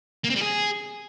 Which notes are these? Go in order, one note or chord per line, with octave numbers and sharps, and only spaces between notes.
A#3
C4
G3
G#4